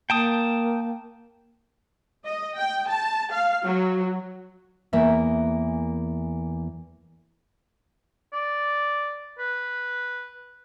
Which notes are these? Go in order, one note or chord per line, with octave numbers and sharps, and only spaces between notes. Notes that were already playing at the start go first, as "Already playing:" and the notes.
A#3 G5 A5 D#6
D#5
G5
A5
F5
F#3
E2 E3 A#3 A#4 E5
D5
B4